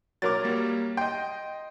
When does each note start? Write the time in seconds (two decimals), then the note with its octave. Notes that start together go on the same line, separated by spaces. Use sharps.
0.22 F#3 A#4 D6 A6
0.44 G3 A#3
0.97 D#5 G5 C6